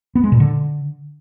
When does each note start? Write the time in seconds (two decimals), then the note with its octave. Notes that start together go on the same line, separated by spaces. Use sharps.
0.15 B3
0.24 G#3
0.32 A#2
0.40 D3